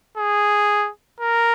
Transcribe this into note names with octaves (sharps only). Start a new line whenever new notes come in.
G#4
A#4